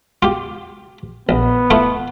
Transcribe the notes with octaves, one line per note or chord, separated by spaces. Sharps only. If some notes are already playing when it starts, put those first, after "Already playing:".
F4 G4
A#1 B3
A3 E4 F4